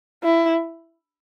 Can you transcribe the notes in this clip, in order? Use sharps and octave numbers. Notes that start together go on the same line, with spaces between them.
E4